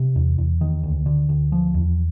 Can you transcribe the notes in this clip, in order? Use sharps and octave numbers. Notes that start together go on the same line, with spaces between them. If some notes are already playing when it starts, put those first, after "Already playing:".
Already playing: C3
E2
E2
D#3
D2
D3
D2
F3
E2